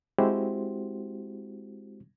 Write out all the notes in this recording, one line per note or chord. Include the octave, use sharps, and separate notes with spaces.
G#3 C4 E4 F#4 G4 C5